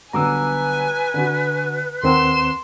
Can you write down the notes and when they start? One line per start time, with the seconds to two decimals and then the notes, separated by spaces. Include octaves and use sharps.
0.13 B1 D3 G3 B4 G#5 A#5 D6 E6
1.14 D3 F#4
2.03 D#2 C4 A#4 F#5 C6 E7